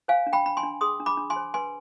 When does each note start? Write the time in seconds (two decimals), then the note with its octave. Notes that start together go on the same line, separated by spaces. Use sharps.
0.08 C5 F5 G#5
0.27 D4
0.33 G5 B5
0.46 D4 B5
0.57 G#5 C6
0.63 D4
0.81 G#4 C6 D#6
1.00 D4
1.06 B5 D6
1.17 D4
1.30 G#5 C6
1.36 C5
1.54 B4 G#5 C6